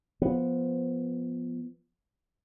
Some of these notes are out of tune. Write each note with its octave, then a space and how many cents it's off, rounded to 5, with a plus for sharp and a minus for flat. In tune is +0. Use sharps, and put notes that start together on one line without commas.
F3 +0 B3 -10